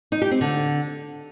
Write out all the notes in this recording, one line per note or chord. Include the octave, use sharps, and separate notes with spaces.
D#4
G4
C4
D3